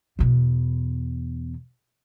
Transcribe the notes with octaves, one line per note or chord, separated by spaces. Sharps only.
E2 B2